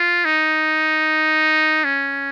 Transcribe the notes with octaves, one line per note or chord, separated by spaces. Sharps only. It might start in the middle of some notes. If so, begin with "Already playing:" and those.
Already playing: F4
D#4
C#4